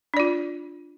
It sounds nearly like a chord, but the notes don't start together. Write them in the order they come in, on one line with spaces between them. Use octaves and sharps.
D4 D5 F4